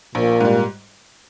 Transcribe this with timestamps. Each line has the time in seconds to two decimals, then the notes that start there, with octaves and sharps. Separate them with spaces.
0.15 A#1 A#2
0.41 G#2 G3